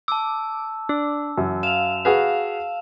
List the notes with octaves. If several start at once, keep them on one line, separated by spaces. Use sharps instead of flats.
A5 D6 E6
D4 E6
F#2 E3
F5 E7 F7
F#4 G#4 B4 F5